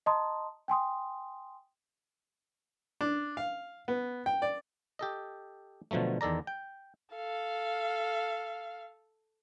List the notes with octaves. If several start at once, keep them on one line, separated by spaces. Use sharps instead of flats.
D#5 A5 A#5 C6 D#6
G5 G#5 C6 D#6
D4
F5
B3
G5
D5
G4 A4 D#5
B2 D3 F3 F#3 A3
E2 D#3 A4 D5 A#5
G5
A4 F5